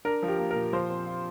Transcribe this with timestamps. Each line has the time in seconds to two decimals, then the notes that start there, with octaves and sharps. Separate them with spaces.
0.05 D4 A#4
0.23 F3
0.28 G4
0.38 A#3
0.51 A#2 A#4
0.73 F3 C5
0.90 C4
1.06 F4